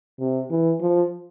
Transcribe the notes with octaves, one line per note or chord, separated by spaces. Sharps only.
C3
E3
F3